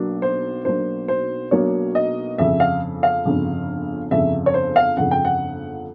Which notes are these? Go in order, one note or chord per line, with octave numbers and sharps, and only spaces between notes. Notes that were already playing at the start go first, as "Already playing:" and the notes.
Already playing: B1 B2 F#3 A#3 D4
C5
B1 B2 F#3 A#3 D4 C5
C5
B1 B2 F#3 A#3 D4 C#5
D#5
G1 F2 C#3 E5
F5
F5
G1 F2 C#3
G1 F2 C#3 E5
C#5
C5
F5
G1 F2 C#3 F#5
G5
F#5